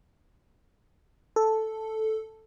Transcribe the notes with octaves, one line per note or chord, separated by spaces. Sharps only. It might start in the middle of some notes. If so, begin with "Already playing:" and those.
A4